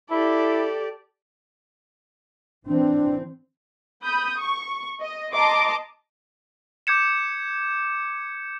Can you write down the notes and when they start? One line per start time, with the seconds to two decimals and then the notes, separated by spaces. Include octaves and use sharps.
0.11 E4 G4 A4 D5
2.67 E3 C4 D4
4.04 B5 D#6 G6
4.39 C#6
5.00 D#5
5.33 D#5 A5 A#5 C6 D6
6.87 D6 G6 G#6 C#7 E7